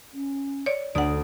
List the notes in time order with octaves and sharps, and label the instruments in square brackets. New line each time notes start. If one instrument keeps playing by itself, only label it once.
[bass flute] C#4
[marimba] C#5 D5
[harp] D2 D#6 D7 [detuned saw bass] D3 [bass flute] D4 [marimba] D5 F#5